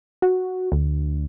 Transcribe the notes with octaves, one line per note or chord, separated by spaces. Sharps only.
F#4
D2